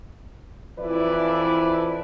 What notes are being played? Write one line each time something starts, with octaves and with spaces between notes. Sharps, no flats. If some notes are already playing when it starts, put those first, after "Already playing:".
F2 E3 F3 E4 B4 D5